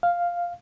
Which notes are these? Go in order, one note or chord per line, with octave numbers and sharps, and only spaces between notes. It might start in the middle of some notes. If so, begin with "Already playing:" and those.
F5